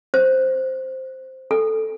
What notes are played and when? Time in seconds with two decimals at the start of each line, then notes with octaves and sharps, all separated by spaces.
0.14 C5
1.51 A4